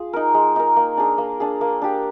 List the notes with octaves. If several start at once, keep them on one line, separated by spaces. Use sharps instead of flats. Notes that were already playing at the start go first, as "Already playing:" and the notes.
Already playing: F4 G#4
D#4 A#4
G#3
D#4 A#4
A#3
D4 G#4
A#3
D4 G#4
A#3
D4 G4